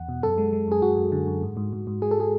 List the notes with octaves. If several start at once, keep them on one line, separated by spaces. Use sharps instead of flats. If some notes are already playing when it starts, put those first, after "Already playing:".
Already playing: E2 F#5
B2
F#2 A4
G#3
G#3
F#2 G#4
F#2 F#4
F#2
D3
F#2
G#2
G#2
G#2
G#2
G#3 G#4
A4
G#4